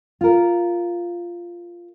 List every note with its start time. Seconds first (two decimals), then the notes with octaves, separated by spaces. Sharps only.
0.21 F4 A#4